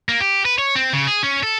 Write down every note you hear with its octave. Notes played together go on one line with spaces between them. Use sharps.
A#3
G4
B4
C#5
C4
C#3
G#4
C#4
A4